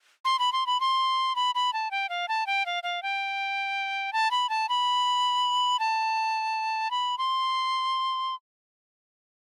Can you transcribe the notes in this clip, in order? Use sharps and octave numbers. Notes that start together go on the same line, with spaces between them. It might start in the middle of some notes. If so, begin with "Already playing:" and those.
C6
B5
C6
B5
C6
B5
B5
A5
G5
F5
A5
G5
F5
F5
G5
A5
B5
A5
B5
A5
B5
C6